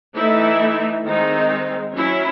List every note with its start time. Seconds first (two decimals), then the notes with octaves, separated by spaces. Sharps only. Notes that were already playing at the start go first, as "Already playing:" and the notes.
0.17 E3 A3 D#4 E4
1.05 D#3 G#3 C4 D#4
1.95 F#3 C#4 E4